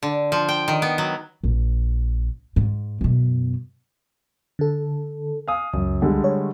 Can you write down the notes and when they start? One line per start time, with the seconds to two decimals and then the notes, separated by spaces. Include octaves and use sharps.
0.03 D3
0.32 F3
0.49 G5
0.68 D#3
0.82 B3
0.98 F#3
1.43 A#1
2.56 G#2
3.01 F#2 B2
4.59 D3 A4
5.48 F5 G#5 D#6
5.74 C#2 F#2
6.02 D3 G3 G#3
6.24 C#5